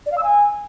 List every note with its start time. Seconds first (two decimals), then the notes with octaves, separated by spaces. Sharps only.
0.06 D5
0.12 F5
0.18 E6
0.23 G#5